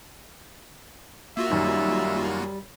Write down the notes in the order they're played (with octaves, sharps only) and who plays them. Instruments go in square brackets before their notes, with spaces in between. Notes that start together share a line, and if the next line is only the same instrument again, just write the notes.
[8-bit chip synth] A#3 F4 F#4 [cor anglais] E5
[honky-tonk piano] F#2 D#3 [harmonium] G3